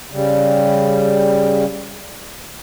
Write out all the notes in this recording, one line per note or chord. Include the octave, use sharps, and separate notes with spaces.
C#3 G3